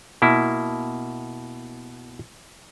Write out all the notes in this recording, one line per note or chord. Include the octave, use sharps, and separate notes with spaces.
B2 A#3 E4